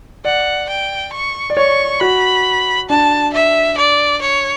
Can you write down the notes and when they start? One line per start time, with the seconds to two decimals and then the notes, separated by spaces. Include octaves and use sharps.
0.25 D5 F#5
0.69 G5
1.13 C#6
1.50 D5
1.57 C#5 C#6
2.01 F#4 B5
2.89 D4 A5
3.34 E5
3.77 D5
4.22 C#5